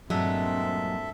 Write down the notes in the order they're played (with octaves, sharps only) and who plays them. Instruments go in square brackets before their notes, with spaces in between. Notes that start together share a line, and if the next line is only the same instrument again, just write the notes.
[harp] G2 A3 [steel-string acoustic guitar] A#2 F#3 G#3 [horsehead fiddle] C4 [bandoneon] A4 E5